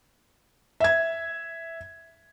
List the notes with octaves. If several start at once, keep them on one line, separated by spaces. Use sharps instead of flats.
E5 G#6